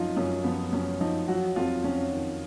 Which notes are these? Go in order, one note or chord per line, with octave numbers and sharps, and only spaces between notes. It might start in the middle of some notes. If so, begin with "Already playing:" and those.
Already playing: F#2 F3 D#4 F4
F#2 C#4
F3 B3
F#2 C#4
F3 D#4
F#3 F#4
F2 F4
F2 C#4
D#3